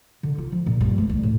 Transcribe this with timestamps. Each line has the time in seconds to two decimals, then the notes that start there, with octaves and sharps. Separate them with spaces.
0.23 D3
0.38 F4
0.52 F3
0.66 A#2
0.80 G2
0.98 A3
1.09 D2
1.23 A2